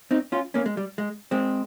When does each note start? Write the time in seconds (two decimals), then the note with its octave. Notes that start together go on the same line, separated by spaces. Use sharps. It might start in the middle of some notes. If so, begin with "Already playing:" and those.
0.11 C4 D#4
0.32 C#4 F4
0.54 A#3 C#4
0.66 G#3
0.77 G3
0.98 G#3
1.31 G#3 C4